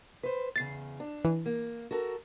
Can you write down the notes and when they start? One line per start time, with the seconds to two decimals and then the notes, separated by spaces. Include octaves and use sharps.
0.23 B4 C5
0.56 E2 C#3 A6 C7
1.00 D4
1.25 E3
1.46 A#3
1.91 F#4 A4 A#4